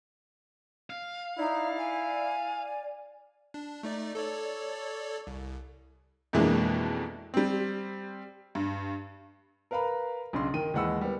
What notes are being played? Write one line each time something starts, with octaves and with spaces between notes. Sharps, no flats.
F5
D#4 E4 D5
G#5
D4
A3 D#4 D5
A4 C#5 D5
C2
F2 B2 E3 G#3 A#3 D4
G3 C4
G2
A#4 B4 F5 A#5 B5
B1 C#3 D4 C6
D#3 G5 D#7
D#2 E3 G#3 F#5 B5 E6
G3 B3